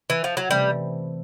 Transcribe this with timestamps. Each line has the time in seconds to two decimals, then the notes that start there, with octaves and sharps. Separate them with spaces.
0.10 E3
0.24 F3
0.37 F#3
0.49 C3 E3 G3 A3 C4